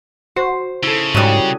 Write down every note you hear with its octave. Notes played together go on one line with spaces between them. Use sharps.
F#4 C5
C#3 E4 A4
G#2 F#3 G3 C#4 D#6